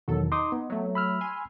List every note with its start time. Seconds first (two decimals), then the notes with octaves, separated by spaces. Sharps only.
0.08 E2 B2 D#3 F#3 A4
0.32 D#4 C6 D6 D#6
0.52 B3
0.70 F#3 A3
0.95 B5 E6 F6
1.21 G#5 C6